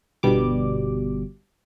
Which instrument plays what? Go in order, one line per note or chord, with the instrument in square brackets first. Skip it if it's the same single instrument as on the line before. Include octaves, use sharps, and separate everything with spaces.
[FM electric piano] G1 B2 G3 D6